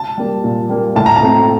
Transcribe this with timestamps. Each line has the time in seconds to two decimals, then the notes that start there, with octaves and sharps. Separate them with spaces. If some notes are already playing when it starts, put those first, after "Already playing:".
Already playing: A5
0.18 G3 A#3
0.44 A#2
0.69 G3 A#3
0.96 A2 A5
1.06 A#5
1.16 A5
1.23 A3 C4